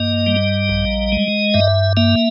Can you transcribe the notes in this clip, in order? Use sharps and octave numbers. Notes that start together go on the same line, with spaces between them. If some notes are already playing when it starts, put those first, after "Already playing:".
Already playing: G2 A#3 D#5
G3
A#1
G#3
G2 E5
A#3 E5